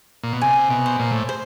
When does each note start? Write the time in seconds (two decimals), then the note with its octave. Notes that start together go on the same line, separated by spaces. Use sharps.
0.23 A#2
0.33 B2
0.42 C3 G#5
0.71 B2
0.86 C5
0.99 A#2
1.11 A2
1.29 C5